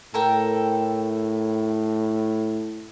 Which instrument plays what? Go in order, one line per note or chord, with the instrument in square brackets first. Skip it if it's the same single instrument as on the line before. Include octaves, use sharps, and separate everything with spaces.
[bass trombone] A2 [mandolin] A4 A#4 G5